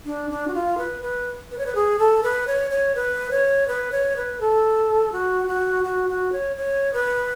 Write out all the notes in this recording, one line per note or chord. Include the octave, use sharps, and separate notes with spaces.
D4
D4
F#4
F4
B4
B4
B4
C#5
B4
G#4
A4
B4
C#5
C#5
B4
C#5
B4
C#5
B4
A4
F#4
F#4
F#4
F#4
C#5
C#5
B4